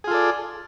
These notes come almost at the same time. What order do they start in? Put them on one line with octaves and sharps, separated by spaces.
G#4 F4 A4 D5